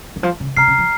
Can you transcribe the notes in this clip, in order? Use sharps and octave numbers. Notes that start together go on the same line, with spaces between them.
D#3
F3
C#3
C3 A#5 F6 C7
C#3
F3